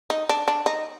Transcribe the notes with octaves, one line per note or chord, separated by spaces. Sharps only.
D#4
D4
D4
D#4